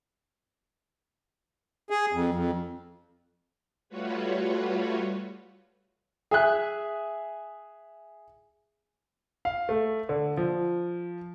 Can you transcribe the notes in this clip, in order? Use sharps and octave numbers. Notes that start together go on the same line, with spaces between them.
G#4
F2
F2
G3 A3 F4 F#4 B4 C#5
G#4 E5 F#6
F5
A3
D3
F3